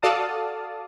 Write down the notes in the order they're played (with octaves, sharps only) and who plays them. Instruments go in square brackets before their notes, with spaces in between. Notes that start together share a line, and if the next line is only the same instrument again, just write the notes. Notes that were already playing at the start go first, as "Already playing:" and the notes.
[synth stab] F#4 A4 D5 F5 A5 D#6